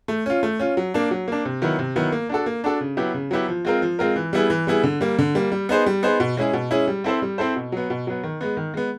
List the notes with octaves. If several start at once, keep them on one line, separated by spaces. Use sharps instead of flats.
A3
C#4 F4
A3
C#4 F4
F#3
A#3 D4
F#3
A#3 D4
C3
D#3 F#3 B3 E4
C3
D#3 F#3 B3 E4
A#3
D4 F#4 A4
A#3
D4 F#4 A4
C#3
F#3 B3 E4 G4
C#3
F#3 B3 E4 G4
F3
G#3 C4 F4 A#4
F3
G#3 C4 F4 A#4
E3
G3 B3 E4 G#4
E3
G3 B3 E4 G#4
D3
G3 A#3
D3
G3 A#3
G3
B3 D#4 G#4 C5
G3
B3 D#4 G#4 C5
B2
G#3 C#4 E4 G#4
B2
G#3 C#4 E4 G#4
G3
C4 E4 A4 C5
G3
C4 E4 A4 C5
B2
F#3 B3
B2
F#3 B3
D#3
G#3 B3
D#3
G#3 B3